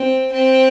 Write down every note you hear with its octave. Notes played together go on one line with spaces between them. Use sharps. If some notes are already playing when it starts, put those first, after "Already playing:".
Already playing: C4
C4